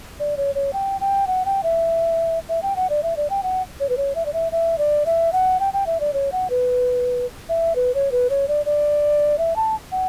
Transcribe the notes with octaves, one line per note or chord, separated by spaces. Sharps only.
D5
C#5
C#5
G5
G5
F#5
G5
E5
E5
G5
F#5
D5
E5
D5
G5
F#5
C#5
B4
C#5
E5
D5
E5
E5
D5
E5
F#5
G5
G5
E5
D5
C#5
F#5
B4
E5
B4
C#5
B4
C#5
D5
D5
E5
A5
F#5